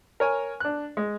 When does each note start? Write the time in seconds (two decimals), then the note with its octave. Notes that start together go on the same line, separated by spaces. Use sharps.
0.20 A#4 C#5 G#5
0.60 D4 F#6
0.97 G#3